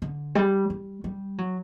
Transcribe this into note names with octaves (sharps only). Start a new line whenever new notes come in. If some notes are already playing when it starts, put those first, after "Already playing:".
D3
G3
G3
G3
F#3